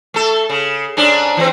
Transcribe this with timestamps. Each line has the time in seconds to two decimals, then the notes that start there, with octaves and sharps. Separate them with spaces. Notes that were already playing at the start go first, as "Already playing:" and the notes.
0.14 A3 A4
0.49 C#3
0.97 G#2 C#4 D4
1.37 E3 C4